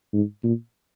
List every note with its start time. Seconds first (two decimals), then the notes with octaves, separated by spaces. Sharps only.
0.13 G#2
0.44 A#2